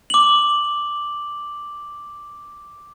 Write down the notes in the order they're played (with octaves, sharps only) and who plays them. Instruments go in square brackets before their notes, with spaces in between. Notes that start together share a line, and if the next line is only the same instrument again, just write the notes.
[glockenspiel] D6 F#7